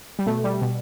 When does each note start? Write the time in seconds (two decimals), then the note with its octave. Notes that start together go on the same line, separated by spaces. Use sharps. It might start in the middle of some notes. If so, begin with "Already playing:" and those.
0.19 G3
0.26 B2 A3
0.44 G3
0.62 B2